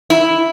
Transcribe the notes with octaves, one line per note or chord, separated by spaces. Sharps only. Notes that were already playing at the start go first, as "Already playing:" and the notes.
E4